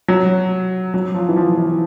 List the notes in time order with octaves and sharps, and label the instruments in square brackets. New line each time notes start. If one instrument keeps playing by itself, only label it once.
[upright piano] F#3
F#3
F3
E3
F3
E3